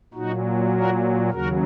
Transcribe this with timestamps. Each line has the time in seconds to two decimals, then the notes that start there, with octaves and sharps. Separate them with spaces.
0.14 A#2 F#3 D#4 F#4
0.72 F#4 A#4
1.31 D#2 C#3 F#3 F#4 A#4